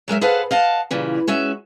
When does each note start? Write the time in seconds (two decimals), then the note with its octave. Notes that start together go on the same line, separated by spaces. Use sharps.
0.08 F#3 G#3 A#4 E5
0.21 G#4 A4 B4 C5 F5 F#5
0.51 D#5 F5 F#5 A5
0.91 A#2 C#3 E3 G3
1.27 G#3 C#4 F#4 E5